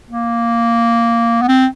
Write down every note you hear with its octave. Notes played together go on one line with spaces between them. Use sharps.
A#3
B3
C4